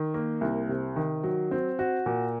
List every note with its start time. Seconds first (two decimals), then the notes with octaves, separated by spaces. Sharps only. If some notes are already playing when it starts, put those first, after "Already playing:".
Already playing: D#3
0.14 A#3
0.41 C2
0.69 C3
0.96 D#3
1.23 F#3
1.51 C4
1.79 F#4
2.06 A#2